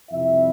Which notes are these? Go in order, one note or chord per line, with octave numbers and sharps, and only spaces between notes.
F2 C3 G3 E4 E5